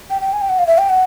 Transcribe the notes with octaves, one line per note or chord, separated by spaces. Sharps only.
G5
G5
G#5
G5
F#5
F5
E5
G5
F#5